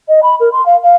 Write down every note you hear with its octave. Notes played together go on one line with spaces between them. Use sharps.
D#5
B5
A#4
C6
F5
F5